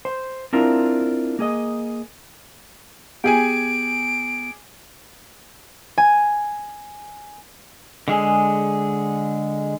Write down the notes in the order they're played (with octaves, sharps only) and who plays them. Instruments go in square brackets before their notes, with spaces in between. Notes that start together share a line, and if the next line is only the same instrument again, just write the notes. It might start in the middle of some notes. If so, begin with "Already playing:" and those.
[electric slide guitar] C5
C4 D4 E4 F4 A#4 C5
A#3 G#4 D#5
[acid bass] B3 [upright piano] G4 G#4 G#5 [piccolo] D7
[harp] G#5
[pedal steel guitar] D3 G#3 G#4